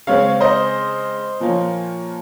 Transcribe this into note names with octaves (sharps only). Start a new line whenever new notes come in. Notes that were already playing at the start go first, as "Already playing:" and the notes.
C#3 G#3 C4 C#5 F5
C5 D#5
A#2 F3 A#3 C#4